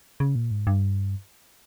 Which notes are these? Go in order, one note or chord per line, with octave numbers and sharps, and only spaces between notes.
C#3
A#2
G#2
G2